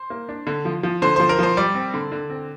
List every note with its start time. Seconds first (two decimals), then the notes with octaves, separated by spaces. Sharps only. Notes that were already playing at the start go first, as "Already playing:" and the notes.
Already playing: C5
0.10 A#3
0.29 D4
0.47 D3
0.65 F3
0.83 F3
1.02 D3 C5
1.16 F3 C5
1.29 A#4
1.39 F3 C5
1.57 G3 D5
1.75 C4
1.94 D3
2.12 D3
2.30 C4